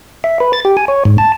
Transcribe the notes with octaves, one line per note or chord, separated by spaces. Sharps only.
E5
B4
A6
G4
G#5
C#5
G#2
A5